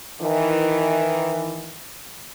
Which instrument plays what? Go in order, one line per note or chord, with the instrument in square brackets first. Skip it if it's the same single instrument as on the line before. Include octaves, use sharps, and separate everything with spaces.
[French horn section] D#3 E3